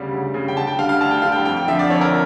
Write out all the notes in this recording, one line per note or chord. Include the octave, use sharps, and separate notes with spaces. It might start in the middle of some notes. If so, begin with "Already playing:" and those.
Already playing: D2 C#3 G3
D2
C#3 G3
G5
D2 A5
G5
D3 G3 F5
F5
D2 A5
G5
D3 G3 F5
G5
F2 G5
G5
D3 F3 E5
D5
F2 C#5
A#4